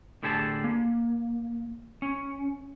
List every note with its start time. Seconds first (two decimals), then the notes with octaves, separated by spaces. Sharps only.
0.23 A2 D3 G4 G#4 A5
0.64 A#3
2.02 C#4